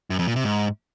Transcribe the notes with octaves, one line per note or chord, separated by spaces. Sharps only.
F#2
F2
A#2
C3
G#2